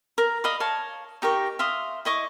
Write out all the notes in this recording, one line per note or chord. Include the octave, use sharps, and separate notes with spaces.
A#4
D#5 F5 B5 D6
C#5 F5 A5
D#4 G4 A#4 C#6
E5 F5 C6 D#6
E4 D#5 C#6 D6